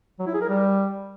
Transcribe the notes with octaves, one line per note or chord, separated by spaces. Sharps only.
F#3
E4
G#4
A#4
G3